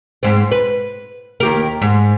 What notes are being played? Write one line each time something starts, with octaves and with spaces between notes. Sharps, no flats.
G#2 C4
B4
D#2 G4 A#4
G#2